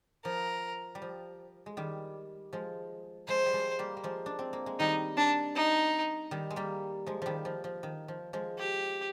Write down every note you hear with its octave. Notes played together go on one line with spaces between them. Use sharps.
F3 A#4
G3
F3
G#3
D#3 G3
F3 G#3
F3 G#3 C5
G3
F3 G#3
G3 A#3
A#3
F3 G#3
D4
C4
A#3
G#3
D#3 G3 D#4
D4
D#4
D#3 G3
G#3
G3 A#3
F3 G#3
D#3 F3 G3
F3
F3
D#3
F3
F3 G#3
G4